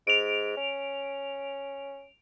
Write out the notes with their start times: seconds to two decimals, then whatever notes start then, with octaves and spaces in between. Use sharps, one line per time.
0.07 G#2 D7 F7
0.57 C#4